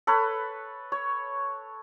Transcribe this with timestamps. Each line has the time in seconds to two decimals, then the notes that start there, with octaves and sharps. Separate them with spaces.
0.07 A4 B4 C#5
0.92 C#5